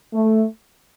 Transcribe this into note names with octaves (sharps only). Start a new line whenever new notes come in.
A3